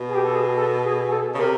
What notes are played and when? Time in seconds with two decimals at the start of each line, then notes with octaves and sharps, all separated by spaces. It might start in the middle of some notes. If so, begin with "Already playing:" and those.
Already playing: B2
0.09 G#4
0.14 G4
0.25 A4
0.35 G#4
0.56 A4
0.84 G#4
1.07 G#4
1.12 A4
1.34 C#3
1.39 C3 A#4